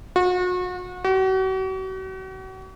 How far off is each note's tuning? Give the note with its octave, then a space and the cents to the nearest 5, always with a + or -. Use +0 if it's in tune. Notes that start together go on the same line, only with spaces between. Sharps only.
F#4 -35
F#4 +40